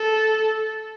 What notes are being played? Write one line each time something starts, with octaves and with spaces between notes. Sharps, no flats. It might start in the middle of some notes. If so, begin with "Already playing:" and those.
Already playing: A4